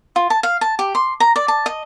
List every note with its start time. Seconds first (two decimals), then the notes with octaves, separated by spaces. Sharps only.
0.16 F4
0.30 A5
0.43 F5
0.61 A5
0.79 G4
0.95 C6
1.20 A#5
1.36 D5
1.48 A5
1.66 D#5